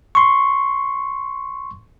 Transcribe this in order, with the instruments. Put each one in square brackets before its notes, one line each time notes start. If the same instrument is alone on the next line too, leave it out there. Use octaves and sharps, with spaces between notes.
[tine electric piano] C6 C#6